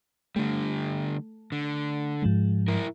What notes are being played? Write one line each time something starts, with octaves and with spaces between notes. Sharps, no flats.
D3 G3 A3
D3
G#2 F3 G#3
E4 A#4